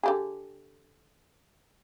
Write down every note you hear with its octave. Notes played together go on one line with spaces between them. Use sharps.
D3 G4 G#4